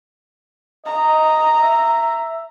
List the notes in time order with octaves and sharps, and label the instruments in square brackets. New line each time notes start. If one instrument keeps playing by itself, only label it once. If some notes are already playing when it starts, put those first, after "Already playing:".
[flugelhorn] D#5 [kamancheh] A#5
[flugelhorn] E5